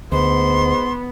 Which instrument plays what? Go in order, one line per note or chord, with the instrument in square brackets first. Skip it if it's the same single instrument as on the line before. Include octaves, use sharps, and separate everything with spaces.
[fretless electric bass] D2 [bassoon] G#2 [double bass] B3 [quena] C6